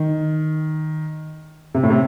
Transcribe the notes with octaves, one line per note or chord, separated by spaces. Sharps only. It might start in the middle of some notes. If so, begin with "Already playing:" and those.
Already playing: D#3
C3
A2
C3